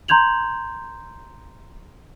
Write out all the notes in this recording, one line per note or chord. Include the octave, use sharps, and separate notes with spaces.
A#5 C6 G6 G#6 F7 F#7